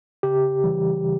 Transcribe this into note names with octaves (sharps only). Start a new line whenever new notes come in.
C#3 G4
E3 G3
C#3